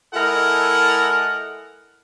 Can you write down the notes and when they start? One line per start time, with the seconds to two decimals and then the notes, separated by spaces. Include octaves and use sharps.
0.14 G#3 E4 A4 A#4 D#5 F#5